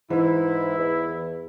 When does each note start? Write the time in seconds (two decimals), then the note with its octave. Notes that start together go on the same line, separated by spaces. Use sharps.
0.10 G#2 E3 E4
0.78 E2